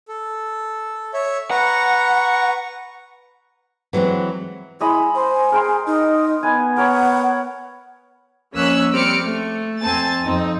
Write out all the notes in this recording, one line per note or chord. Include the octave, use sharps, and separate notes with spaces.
A4
C#5 E5
B4 F#5 A#5 C#6
E3 F#3 G#3 C4
G#3 E4 D#5 B5
C5 G#5
G#4 A#4 G5 C6
D#4 D#5
B3 B4 G#5
A#4 C#5 F#5 B5
F2 A#3 C#4 E6 F#6 B6
G3 C4 D6 F6 C#7
A3
F2 C4 G#5 A5 A6
F2 C4 D#4